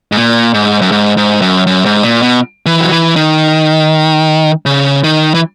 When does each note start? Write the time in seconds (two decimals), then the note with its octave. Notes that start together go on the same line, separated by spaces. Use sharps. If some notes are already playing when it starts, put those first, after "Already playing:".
0.12 G#2
0.17 A#2
0.54 G#2
0.82 F#2
0.92 G#2
1.17 G#2
1.42 F#2
1.67 F#2
1.86 G#2
2.03 A#2
2.22 B2
2.66 E3
2.81 F#3
2.91 E3
3.16 D#3
4.66 C#3
5.04 D#3
5.34 E3